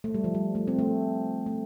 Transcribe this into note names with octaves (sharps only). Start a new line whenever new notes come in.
A3
G3
F3
G3
A3
C4
A3
A3